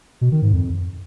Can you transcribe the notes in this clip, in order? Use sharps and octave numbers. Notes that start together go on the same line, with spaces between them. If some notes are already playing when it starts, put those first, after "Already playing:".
B2
D#3
G#2
F2